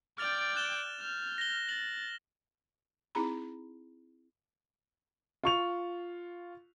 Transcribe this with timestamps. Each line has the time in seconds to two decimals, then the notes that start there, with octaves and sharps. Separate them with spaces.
0.18 D5 G5 F6 A6 F7
0.56 F#6 E7 G7
1.00 F6 G6
1.38 A#6 G7
1.69 A6 F#7
3.15 C4 D#4 E4 G#4 A#5 B5
5.43 F4 C#6 F7